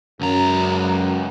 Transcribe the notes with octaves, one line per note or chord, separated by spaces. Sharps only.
C#2 F#2 A#5